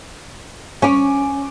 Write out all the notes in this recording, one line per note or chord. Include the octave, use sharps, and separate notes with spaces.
C#4 G#5 D6